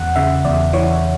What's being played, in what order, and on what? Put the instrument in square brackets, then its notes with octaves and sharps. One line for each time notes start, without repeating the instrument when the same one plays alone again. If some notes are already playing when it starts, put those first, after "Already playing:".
Already playing: [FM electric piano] E2 F#5
C#3 E5
E2 D5
E3 C#5